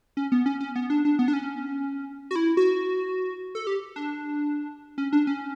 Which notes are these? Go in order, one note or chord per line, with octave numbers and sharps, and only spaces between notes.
C#4
B3
C#4
C#4
B3
D4
D4
B3
D4
C#4
F#4
E4
F#4
A4
G4
D4
C#4
D4
C#4